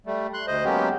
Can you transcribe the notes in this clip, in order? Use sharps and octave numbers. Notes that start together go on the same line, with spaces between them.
G3 A3
C6 F#6
D2 C5 D#5
F#3 G#3 A#3 B3 C#4 G4